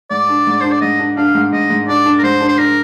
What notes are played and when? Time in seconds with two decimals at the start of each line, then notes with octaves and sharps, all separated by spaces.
0.10 G#2 D5
0.29 D4
0.47 G#2
0.61 D4 C5
0.72 D5
0.81 G#2 D#5
0.99 D4
1.17 D4 F5
1.35 G#2
1.52 G#2 D#5
1.70 G#2
1.88 D4 D5
2.06 D4
2.18 A#4
2.23 G#2 C5
2.41 D4
2.48 C5
2.58 D4 A#4